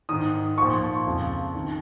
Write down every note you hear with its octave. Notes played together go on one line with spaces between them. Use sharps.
G#2 D#3 D#6
A#2 F3 C#6
F2 C#3 F3
D#3